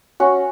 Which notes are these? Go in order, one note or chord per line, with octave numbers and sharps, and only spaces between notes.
C#4 F#4